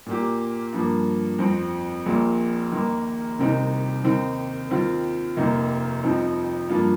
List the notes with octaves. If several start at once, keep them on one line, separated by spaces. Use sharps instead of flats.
A#2 A#3 G4
G2 F3 A#3
F2 F3 C4
A#1 A#2 A#3
D#2 D#3 A#3
C2 C3 D#3 C4 D#4
D#2 D#3 C4 D#4
D#2 D#3 C4 F4
F1 D#2 D#3 A#3 D#4
F2 F3 C4 D#4
G2 F3 A#3 F4